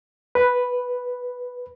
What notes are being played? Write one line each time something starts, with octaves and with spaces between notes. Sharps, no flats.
B4